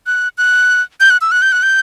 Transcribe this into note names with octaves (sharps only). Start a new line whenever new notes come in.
F#6
F#6
G6
F#6
E6
F#6
G6
F#6
G6